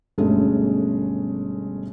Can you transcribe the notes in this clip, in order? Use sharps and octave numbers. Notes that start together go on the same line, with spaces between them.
G1 B2 G#3 A3 C#4